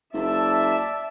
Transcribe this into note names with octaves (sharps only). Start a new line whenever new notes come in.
F#1 D5 E5 A5